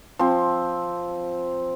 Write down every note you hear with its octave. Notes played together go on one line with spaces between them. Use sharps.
F3 C4